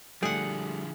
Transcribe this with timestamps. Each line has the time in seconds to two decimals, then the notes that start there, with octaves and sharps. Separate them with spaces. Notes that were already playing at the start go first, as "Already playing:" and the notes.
0.23 D3 F3 G3 A3 G#4 F#5